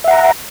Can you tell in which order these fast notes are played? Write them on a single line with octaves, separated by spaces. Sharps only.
E5 F#5 A#5